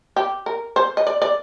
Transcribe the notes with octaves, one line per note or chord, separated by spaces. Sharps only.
G4
A#4
C5
D#5
D5
D5